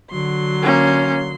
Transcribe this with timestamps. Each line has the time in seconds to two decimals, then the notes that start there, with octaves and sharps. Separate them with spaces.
0.10 D3 F#3 C6
0.63 A#3 C#4